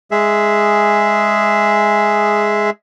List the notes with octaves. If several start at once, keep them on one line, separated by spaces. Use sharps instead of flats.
G#3 G#4 E5